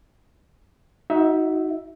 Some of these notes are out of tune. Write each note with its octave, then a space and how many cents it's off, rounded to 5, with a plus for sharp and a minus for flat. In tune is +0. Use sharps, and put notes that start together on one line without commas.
D#4 +25 F#4 +0 E5 +0